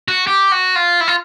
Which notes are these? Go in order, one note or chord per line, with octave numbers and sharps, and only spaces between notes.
F#4
G4
F#4
F4
E4
F4